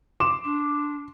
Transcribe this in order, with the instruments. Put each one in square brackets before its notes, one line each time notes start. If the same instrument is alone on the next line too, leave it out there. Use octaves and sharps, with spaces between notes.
[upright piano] C6 D6 E7
[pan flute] D4